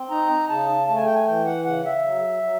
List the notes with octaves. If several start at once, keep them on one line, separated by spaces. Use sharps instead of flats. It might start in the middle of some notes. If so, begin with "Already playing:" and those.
Already playing: C4
D#4 A#5
C#3 A5
A3 A5
G#5
G5
G#5
E3 G5
F#5
C#3 F#5
E5
F#3
F#3